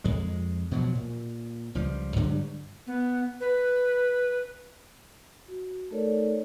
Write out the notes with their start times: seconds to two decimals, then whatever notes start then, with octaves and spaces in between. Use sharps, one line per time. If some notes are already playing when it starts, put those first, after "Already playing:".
0.04 F2 G#3
0.71 B2 F3 F#3
0.95 A#2
1.75 C#2 F3 G3
2.16 G2 D3 F#3 G3
2.87 B3
3.41 B4
5.48 F#4
5.91 A3 D#4 A4 A#4 C#5 D5